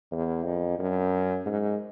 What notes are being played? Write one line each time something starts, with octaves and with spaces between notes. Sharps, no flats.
E2
F2
F#2
G#2